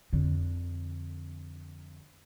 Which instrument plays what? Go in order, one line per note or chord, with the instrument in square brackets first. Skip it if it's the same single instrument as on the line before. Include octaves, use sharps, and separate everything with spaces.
[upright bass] F2 D3